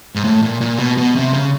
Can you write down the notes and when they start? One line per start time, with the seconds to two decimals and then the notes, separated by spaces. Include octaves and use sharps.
0.15 G#2
0.24 A2
0.43 A#2
0.61 A#2
0.79 B2
0.98 B2
1.16 C3
1.33 C#3